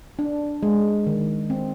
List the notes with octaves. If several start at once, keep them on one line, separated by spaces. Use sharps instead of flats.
D4
G#3
D#3
C4